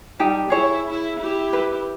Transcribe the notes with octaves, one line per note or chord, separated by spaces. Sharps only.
G3 D#4 G4 A5
E4 G#4 C#5
E4
E4 G4
B4